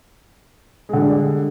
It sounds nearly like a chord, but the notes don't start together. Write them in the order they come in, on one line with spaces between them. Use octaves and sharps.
G#3 D3 G3 D4